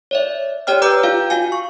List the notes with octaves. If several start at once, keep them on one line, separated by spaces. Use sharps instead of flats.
C#5 D5 E5
G4 C#5 D5 G5 F6
B4 G5 A#5 D6 E6 G6
F4 F5 G6
F#4 F5 G#5
C#6